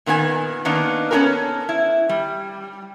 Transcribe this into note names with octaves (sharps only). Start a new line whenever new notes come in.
A#2 D#3 B3 D#4 G#5
D#3 A#3 B3 D4 D#4
B3 C#4 F4 G4 A4 A#4
E4
G3